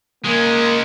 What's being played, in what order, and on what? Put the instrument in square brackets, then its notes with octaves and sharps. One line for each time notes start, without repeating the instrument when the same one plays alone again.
[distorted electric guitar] G#3 C#4 [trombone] A#3